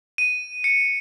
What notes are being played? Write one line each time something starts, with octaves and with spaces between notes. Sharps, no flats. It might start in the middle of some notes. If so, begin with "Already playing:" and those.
D#7
C#7